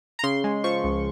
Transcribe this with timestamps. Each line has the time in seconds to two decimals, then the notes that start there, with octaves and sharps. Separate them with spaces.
0.19 A#5
0.24 C#3 C6
0.44 G#3
0.64 F3 C#6
0.84 C#2